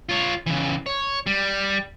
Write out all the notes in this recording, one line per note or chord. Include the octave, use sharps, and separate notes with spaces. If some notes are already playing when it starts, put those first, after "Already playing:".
F4 C#5
C#3 E3
C#5
G3